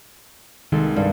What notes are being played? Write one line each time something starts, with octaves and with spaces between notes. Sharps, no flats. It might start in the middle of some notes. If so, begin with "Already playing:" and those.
C2 D#3 G#3 A4
G2